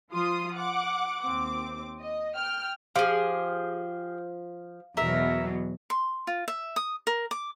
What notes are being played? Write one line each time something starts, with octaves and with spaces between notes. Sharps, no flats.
F3 F4 C6 D#6
F#5 D6
D#2 C4 D6
D#5
G5 F6
F3 G4 G#4 F5
E2 B2 F#3 A#4 E5
C6
F4
E5
D#6
A#4
D6